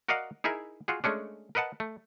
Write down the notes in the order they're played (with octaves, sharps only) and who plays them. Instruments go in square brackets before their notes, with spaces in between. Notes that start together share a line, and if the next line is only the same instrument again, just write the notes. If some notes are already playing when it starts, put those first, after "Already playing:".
[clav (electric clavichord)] F#4 A#4 D5 D#5 F5 F#5
D#4 E4 G#4 A#4 E5
F4 F#4 G#4
G#3 A3 C#4 D4
A#4 B4 D#5 F#5 A5
A3